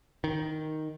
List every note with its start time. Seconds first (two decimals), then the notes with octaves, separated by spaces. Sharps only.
0.24 D#3